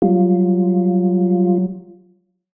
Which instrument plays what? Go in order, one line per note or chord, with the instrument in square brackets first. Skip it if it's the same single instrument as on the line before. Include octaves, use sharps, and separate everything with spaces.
[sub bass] F#3 [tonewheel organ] G3 F4